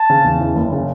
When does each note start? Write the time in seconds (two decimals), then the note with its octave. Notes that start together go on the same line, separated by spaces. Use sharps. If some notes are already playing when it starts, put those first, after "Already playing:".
Already playing: A5
0.10 C#3
0.24 E2
0.40 E3
0.55 F#1
0.72 C#3